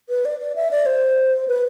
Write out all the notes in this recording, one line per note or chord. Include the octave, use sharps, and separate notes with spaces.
B4
D5
D5
E5
D5
C5
B4